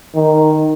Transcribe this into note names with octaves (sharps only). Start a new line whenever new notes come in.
D#3